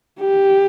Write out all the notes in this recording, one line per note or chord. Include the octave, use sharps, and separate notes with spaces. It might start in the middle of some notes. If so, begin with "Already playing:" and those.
G4